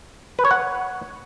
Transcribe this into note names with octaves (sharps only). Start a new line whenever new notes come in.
B4
C#5
F#5